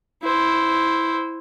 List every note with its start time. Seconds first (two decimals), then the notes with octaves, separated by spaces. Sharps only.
0.23 E4 C5